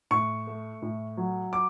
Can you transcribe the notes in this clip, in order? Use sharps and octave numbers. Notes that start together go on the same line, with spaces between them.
A2 C#6
A3
A2
F#3
D6